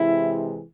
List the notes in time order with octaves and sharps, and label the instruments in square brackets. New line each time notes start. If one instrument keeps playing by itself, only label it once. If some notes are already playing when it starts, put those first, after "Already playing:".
Already playing: [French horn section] C3 E3 G#3 E4